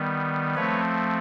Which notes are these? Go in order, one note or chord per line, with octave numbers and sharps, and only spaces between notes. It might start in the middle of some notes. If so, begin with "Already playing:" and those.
Already playing: D#3 G3 B3
F3 A3 C4 B4 C#5